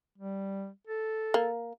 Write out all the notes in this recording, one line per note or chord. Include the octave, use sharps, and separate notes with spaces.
G3
A4
A#3